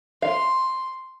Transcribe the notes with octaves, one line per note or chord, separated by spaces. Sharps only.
F5 C6